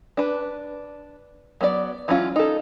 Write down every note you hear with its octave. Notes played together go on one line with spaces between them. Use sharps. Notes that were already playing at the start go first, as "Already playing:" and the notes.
D4 B4
F#3 B3 G#4 D5
E3 F#3 G#3 C#4 F4
D#4 A4